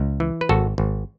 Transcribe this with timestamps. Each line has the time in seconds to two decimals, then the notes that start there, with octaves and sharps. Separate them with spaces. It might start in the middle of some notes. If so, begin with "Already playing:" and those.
Already playing: C#2
0.20 E3
0.41 B4
0.49 G#1 F#4 A4
0.78 G#1